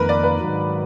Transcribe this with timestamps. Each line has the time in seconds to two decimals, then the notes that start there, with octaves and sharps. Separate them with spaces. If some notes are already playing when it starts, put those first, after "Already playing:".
Already playing: F2 D#3 A#3 A#4 B4
0.09 D5
0.24 B4
0.39 G#2 D#3 F#3